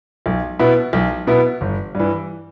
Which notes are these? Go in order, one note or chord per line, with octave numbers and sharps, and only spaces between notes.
B1
B2 B3 E4
B1
B2 B3 E4
G1
G2 E3